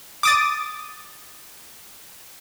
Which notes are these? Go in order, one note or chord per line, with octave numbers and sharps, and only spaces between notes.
D6 D#6 A6